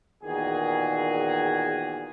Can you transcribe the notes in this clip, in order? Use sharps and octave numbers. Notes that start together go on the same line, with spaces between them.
E2 A#2 D#3 F#4 G#4